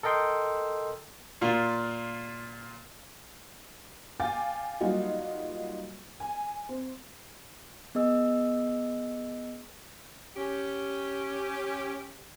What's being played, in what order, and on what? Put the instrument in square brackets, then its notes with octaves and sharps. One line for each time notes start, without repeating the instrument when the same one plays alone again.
[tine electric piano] A4 A#4 D#5 G5 C6
[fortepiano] A#2 F4
[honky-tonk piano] F5 G5 G#5 D6 A6
F#3 G3 A#3 D#4 F4 F#4
G#5
C4
[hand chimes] B3 G#4 D#5 E6
[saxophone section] C#4 G4